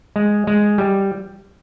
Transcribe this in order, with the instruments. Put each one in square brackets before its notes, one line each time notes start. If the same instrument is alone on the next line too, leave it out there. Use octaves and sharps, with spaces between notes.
[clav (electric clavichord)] G#3
G#3
G3